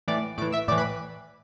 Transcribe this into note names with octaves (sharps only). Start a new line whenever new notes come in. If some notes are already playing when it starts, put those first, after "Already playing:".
A2 E3 D5 D6
A2 E3 D5 D6
E5 E6
A2 E3 D5 D6
B4 B5